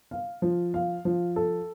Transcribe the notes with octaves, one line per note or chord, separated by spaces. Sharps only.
F5
F3
F5
F3
A4